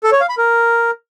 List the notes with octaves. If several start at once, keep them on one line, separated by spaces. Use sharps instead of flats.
A4
C#5
F5
B5
A#4